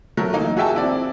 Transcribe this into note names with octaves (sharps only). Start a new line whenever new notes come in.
F#3 A3 A#4
E3 A#3 D#4
F#4 G#4 E5 G5 A5
C4 E4 D5